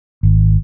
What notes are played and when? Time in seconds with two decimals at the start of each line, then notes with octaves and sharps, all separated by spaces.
0.23 G#1